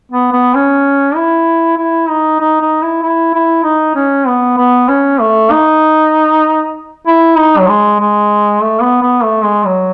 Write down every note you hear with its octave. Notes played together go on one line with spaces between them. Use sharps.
B3
B3
C#4
E4
E4
D#4
D#4
D#4
E4
E4
E4
D#4
C#4
B3
B3
C#4
A3
D#4
E4
D#4
F#3
G#3
G#3
A3
B3
B3
A3
G#3
F#3